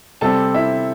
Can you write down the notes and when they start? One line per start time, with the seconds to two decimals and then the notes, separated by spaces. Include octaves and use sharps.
0.21 C3 G3 C4 A4 A5
0.54 E4 E5